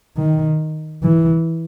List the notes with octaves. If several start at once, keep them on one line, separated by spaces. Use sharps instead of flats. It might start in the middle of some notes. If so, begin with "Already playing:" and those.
D#3
E3